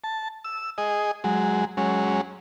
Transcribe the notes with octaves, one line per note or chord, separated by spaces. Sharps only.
A5
E6
G#4 D#5
F#3 G#3
F#3 G#3 C#4